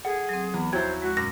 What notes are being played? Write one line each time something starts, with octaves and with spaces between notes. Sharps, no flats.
G#4 A4 F#5
F#3 C4
E2 B5
D#2 F3 F#3 E4 C5 G#6
G#3 F#4
F#2 A#2 A#6